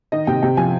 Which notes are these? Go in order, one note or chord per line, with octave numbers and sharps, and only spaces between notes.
D#3 D#5
C3 G5
C3 G5
F3 G#5